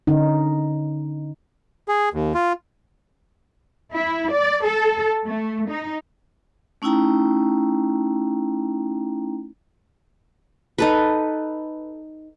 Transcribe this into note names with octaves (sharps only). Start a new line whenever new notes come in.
D3 C#4 D#4
G#4
D#2
F4
E4
D5
A4
A3
D#4
A3 C#4 D#4 E4 G5 A#5
D#4 A4 B4